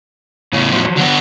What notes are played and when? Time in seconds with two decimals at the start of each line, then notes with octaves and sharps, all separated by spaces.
0.53 E2 A2 C#3
0.72 F3 F#3
0.97 D3 B3